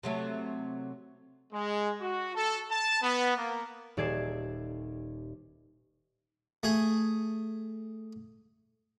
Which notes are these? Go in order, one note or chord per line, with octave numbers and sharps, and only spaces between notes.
C3 F#3 A3
G#3
F#4
A4
A5
B3
A#3
D#1 A4 D5 G#6 C7 E7
A3 G#4